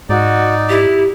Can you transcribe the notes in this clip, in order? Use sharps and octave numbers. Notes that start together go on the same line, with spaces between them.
G#2 D#4 F#4 D5
E4 G4